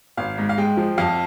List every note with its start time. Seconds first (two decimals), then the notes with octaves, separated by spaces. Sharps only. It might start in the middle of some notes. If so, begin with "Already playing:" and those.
0.17 G#1 F5
0.38 G#2
0.49 F5
0.58 G#3 G5
0.77 F3
0.98 F2 F5